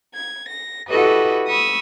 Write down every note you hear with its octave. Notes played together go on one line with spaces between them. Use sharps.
G#6
A#6
E4 F#4 G4 A4 B4 D#5
B5 C#6 D#6 E6